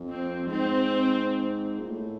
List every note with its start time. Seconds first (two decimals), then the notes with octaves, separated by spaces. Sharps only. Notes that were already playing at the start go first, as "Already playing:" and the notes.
Already playing: F2
0.11 C4
0.46 G#2 C4
1.79 A#2
1.89 A2